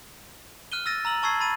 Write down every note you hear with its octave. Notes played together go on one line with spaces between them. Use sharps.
F6 F#6 D#7 G7
E6 F6 A6 A#6 D#7
A#5 E6 F#7
A5 C#6 E6 G#6 C7
B5 A6 D#7